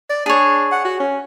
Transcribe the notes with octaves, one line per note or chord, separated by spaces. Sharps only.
D5
D4 G#4 C#5
F#5
F#4
C#4